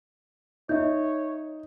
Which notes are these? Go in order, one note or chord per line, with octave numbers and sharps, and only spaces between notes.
D#4 C#5 E5 G6